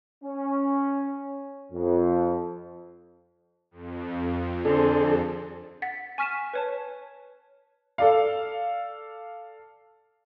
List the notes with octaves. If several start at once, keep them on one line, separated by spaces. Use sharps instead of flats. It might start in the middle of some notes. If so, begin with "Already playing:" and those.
C#4
F2
F2
D3 C4 D4 G#4 A4
F#5 A6 B6
G#5 C#6 F6 B6 D#7 E7
B4 C#5 A5
A4 D5 F5